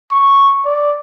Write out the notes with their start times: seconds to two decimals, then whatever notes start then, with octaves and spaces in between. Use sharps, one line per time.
0.11 C#6
0.65 D5